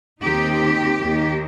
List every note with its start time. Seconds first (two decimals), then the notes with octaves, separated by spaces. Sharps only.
0.23 D#2 D#3 C4 D#4 G4
0.99 D#2 D#3 A#3